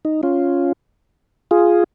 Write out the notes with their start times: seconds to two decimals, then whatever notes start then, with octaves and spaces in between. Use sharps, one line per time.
0.05 D#4
0.23 C#4 F4
1.51 F4 G#4